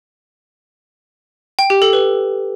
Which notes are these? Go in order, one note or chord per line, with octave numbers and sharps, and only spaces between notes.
G5
G4
A4
B4